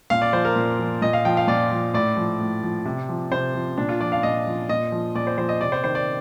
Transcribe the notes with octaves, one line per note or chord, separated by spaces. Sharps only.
A#2 F5
D5
F3 C5
A#4
A#2
F3
A#2 D#5
F5
F3 G5
F5
A#2 D5
F3
A2 D5
F3
A2
F3
C3
F3
C3 C5
F3
A#2 D4
F4
F3 D5
F5
A#2 D#5
F3
A#2 D#5
F3
A#2 D5
C5
F3 C5
D#5
C3 D5
C5
D#3 C5
D5